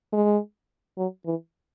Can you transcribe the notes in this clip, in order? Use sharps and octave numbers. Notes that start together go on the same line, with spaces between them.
G#3
F#3
E3